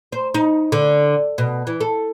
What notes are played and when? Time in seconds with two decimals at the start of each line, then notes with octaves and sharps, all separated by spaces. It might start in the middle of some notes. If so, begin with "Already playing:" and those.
0.12 C5
0.34 D#4
0.72 D3
1.38 B2
1.67 E3
1.81 A4